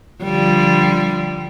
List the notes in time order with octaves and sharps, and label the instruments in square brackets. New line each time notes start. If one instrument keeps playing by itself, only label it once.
[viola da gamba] D3 F3 G3